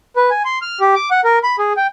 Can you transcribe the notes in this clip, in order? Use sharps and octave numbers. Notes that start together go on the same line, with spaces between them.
B4
G#5
C6
F6
G4
D6
F#5
A#4
B5
G#4
G5